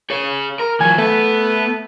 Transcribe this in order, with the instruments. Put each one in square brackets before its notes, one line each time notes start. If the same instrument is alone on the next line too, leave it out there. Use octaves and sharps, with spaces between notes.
[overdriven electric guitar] G#4 C#5
A#4
[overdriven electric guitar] E3 F#3 [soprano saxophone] G#5
[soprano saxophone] A3 [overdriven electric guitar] B3